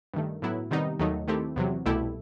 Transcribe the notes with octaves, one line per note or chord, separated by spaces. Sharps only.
G2 D#3 A3
A2 F#3 B3 E4
C3 D#3 G3 B3 D#4
D#2 D#3 F#3 A3 D#4
D#3 A3 C4 E4 G4
E2 C3 F#3
C2 B2 A3 E4 G4